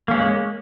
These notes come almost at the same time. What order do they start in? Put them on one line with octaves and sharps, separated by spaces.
A#3 C#4 G#3